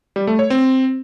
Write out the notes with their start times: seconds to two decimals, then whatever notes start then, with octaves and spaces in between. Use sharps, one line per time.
0.16 G3
0.27 A3
0.39 C#5
0.50 C4